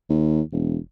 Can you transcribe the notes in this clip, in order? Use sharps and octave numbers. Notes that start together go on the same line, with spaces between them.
D#2
E1